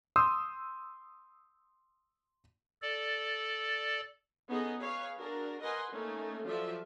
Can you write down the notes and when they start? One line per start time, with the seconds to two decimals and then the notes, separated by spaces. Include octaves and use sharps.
0.16 C6 D#6 E6 G6
2.82 A4 D5
4.48 B3 C#4 D#4 G#4 A4 D#5
4.78 G#4 B4 C#5 F5
5.18 D4 F#4 G#4 A#4
5.62 A#4 B4 D#5 F#5 G#5 C6
5.91 A3 A#3 C#4 D#4
6.45 F3 F#3 F4 A4 D5 E5